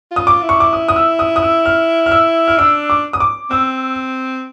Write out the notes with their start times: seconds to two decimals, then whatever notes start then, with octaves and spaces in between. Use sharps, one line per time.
0.11 F4 D#6
0.27 D6
0.42 E4
0.49 C#6
0.60 D6
0.73 D#6
0.88 D#6
0.96 E6
1.19 D#6
1.36 D#6
1.42 E6
1.66 F6
2.06 F6
2.11 E6
2.48 F6
2.58 D4 E6
2.90 D6
3.13 D#6
3.20 D6
3.51 C4 E6